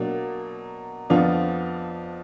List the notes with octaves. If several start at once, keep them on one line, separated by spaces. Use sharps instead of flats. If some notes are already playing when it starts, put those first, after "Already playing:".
Already playing: B2 F#3 A#3 D4
F2 F3 B3 D4 F4